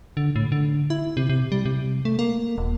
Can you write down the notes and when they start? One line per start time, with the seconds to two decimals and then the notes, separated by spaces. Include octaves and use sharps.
0.17 D3
0.36 A2
0.52 D3
0.90 E4
1.17 C3
1.29 C3
1.52 G3
1.66 C3
2.05 A3
2.19 A#3
2.58 D#1